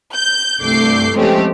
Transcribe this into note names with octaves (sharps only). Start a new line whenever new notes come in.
G6
C2 G2 A3 D6 G6 C7
F3 G#3 A3 C4 C#4 G4